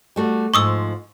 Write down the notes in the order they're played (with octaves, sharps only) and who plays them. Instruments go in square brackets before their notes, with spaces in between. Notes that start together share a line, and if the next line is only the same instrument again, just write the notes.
[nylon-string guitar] G3 A3 F#4
[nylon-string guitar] G#2 F3 [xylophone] C#6 D#6 E6